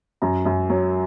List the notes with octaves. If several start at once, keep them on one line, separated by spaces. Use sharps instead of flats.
F#2 A#5
F#2
F#3